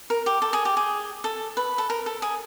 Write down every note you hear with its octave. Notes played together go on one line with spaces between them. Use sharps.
A#4
G4
A4
G#4
G4
G#4
A4
B4
A4
A#4
A4
G#4